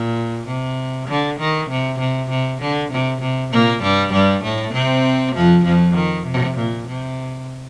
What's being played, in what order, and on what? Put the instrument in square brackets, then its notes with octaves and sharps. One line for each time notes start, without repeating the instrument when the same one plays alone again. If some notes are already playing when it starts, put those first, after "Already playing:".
Already playing: [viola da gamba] A#2
C3
D3
D#3
C3
C3
C3
D3
C3
C3
A#2 A#3
G2 G3
G2 G3
A2 A3
C3 C4
F2 F3
F2 F3
D#3
C3
A#2
C3